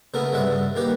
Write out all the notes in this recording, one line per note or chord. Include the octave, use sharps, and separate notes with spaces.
C#3 A3 B3 E4 A#4
G2 C3 G#3 E5 F#5
G2 C#3
D#3 A#3 G4 B4